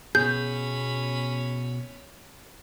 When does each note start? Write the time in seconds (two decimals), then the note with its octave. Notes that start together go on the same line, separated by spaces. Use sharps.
0.15 B2 C#4 G#4 B5 G6